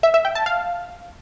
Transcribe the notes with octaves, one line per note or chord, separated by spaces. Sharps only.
E5
E5
G5
A5
F5